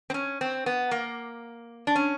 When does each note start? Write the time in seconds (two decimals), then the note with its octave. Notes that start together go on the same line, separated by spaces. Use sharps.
0.10 C4
0.14 C#4
0.41 C4
0.66 B3
0.91 A#3
1.87 D4
1.95 C#4